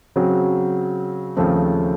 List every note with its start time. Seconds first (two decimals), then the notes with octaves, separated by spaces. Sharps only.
0.16 C#3 F#3 C4
1.37 D#2 C#3 F3 A3 C4